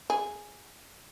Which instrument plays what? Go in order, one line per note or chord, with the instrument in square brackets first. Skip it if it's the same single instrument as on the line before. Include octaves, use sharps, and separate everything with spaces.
[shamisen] G#4